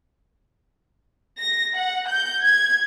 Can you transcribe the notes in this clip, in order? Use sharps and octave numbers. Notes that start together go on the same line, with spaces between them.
A#6
F#5
G6
G#6